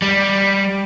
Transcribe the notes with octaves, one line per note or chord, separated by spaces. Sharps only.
G3